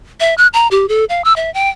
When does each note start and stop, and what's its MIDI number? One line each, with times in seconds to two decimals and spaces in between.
0.20 0.35 76
0.38 0.47 90
0.53 0.68 82
0.71 0.88 67
0.89 1.05 69
1.09 1.24 77
1.25 1.33 88
1.36 1.52 76
1.54 1.69 79